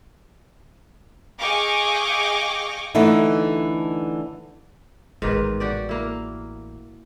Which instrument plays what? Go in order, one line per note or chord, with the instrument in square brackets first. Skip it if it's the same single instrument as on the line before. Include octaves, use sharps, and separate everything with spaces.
[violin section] G#4 D#5 F5 G5 C#6 D6
[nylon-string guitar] D3 E3 A3 D#4 E4
[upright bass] A1 B3 [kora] G#2 D#3 B4
[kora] F#4 G4 D5
A#3 E4